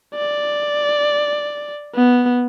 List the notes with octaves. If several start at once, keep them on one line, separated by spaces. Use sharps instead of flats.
D5
B3